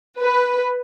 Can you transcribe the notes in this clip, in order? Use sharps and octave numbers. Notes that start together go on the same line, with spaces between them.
B4